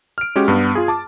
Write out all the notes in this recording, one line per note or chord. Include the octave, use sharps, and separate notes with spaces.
F6 D7
G#3 C#4 F#4 G4 C#5
G2 B3
F4 G#4
A5 D6